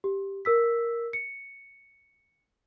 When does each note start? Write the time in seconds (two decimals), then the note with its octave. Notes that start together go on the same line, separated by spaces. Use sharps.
0.04 G4
0.45 A#4 E6 B6
1.13 C#7